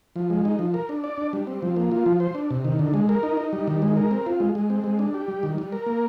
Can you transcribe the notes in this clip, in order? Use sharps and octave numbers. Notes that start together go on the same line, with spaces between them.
F3
G#3
D#4
F3
A#4
D4
D5
D4
G3
C4
F3
A#3
F4
F3
C5
D4
C3
D#3
D3
G#3
A#4
D#4
D#4
G3
D#3
G#3
A#4
C4
F4
G#3
G#3
C4
G#3
D4
G4
G3
D#3
G3
A#4
A#3